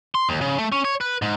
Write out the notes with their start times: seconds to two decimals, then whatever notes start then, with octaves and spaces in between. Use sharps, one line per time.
0.15 C6
0.29 D#2
0.41 C#3
0.58 A3
0.72 C#4
0.85 C#5
1.01 B4
1.22 G#2